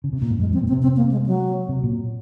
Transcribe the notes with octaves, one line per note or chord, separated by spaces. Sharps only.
C#3
C3
A#2
G#2
F#2 G#3
F2 C4
A#2
C4
C3
C4
A#3
G#3
F#3
C3
A#2